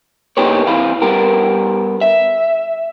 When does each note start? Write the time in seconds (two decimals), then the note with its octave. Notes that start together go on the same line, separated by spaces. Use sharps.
0.37 B2 A#3 D#4 G4 B4 C#5
0.67 C3 E3 B4 F5
1.02 G2 B3 G4 A#4
2.01 E5